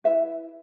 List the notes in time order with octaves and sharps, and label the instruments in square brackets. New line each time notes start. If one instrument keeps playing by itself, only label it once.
[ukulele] E4 B4 E5